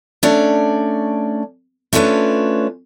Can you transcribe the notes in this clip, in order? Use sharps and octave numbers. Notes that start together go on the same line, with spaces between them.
A3 C#4 D4 C#5 D5
A3 C#4 D4 F4 B4 C#5